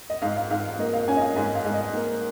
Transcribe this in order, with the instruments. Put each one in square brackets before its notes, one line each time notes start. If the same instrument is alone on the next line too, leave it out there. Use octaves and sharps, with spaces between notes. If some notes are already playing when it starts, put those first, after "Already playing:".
[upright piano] D#5
G#2 F5
F5
G#2 F5
F5
A#3 D#5
F5
C#4 G#5
D#5
F5
G#2 G#5
F5
G#2
D#5
A#3